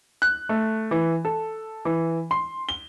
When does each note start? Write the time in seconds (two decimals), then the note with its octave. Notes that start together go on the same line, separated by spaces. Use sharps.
0.22 F#6
0.49 A3
0.91 E3
1.25 A4
1.85 E3
2.31 C6
2.69 G7